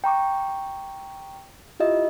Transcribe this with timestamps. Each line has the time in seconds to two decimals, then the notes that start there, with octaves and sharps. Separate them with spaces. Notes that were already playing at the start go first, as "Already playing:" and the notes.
0.04 G5 A#5 C#6 D6
1.80 E4 F4 G4 D#5 E5